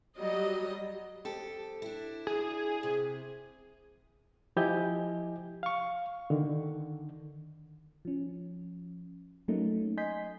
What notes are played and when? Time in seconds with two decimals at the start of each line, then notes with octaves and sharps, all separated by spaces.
0.18 F#3 G3 D#5
1.25 F2 G4 A4
1.82 D4 E4
2.27 G#4
2.83 C3
4.57 F3 E4 G4 D#5 G#5 G6
5.63 F5 C#6
6.30 D3 D#3
8.05 F3 C#4
9.48 F#3 A3 A#3 C#4 D#4
9.97 D#5 G#5 C6 G6 B6